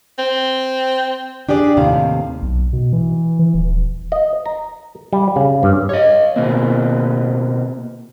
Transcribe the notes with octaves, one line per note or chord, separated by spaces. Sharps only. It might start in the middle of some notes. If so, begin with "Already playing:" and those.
C4
D4 G4 G#4 D5
D#2 A2 C3 F5
B1
B2
E3
E3
D#1
D#5
A#5
G3
C#3
G2
C#5 D#5
B2 A#3 C4